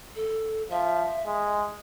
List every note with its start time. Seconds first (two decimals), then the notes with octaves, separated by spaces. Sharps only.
0.16 A4
0.70 F3 E5
1.26 G#3